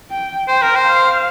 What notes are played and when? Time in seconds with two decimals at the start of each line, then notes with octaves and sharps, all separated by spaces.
0.11 G5
0.48 C5 G5
0.62 A#4
0.75 C5
0.87 F5